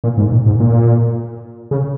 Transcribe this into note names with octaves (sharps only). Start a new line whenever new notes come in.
A#2
G#2
A#2
G#2
A#2
C#3